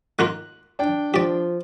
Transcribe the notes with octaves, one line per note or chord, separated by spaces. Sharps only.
D#3 A#3 F4 F#6
D4 G5
F3 G4 D5